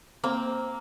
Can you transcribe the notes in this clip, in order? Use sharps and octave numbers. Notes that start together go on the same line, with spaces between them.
A#3 C4